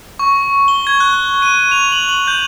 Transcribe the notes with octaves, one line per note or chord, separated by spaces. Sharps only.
C#6
G7
G#6
F#6
D#7
F7
F#7
F#7
G6